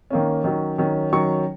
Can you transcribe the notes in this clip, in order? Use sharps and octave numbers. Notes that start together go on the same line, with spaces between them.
D#3 A#3 C#4
D#3 F#3 C#4
D#3 F#3 C#4
D#3 F#3 C#4 C#6